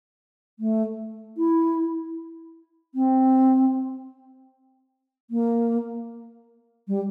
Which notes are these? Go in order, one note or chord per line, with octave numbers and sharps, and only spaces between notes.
A3
E4
C4
A#3
G3